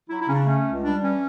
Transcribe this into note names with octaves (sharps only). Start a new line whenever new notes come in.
F#3 E4
E4
C#3 C#4
D4
A3 C#4
C#2
G3 D4
E3 C#4